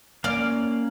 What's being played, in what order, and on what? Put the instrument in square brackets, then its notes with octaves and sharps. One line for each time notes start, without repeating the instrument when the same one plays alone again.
[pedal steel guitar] A#3 C#4 F5 [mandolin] D5 F6